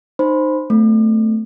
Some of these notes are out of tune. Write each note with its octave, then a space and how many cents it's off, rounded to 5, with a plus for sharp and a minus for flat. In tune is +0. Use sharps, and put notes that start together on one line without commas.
D#4 -20 C5 +0 B5 +0
A3 +5 C4 -35